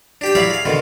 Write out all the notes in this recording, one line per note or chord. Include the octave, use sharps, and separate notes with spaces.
D4 G4 G5
F#3 E4 D5 F5 B5
G#4 F5
B2 D3 D#3 F4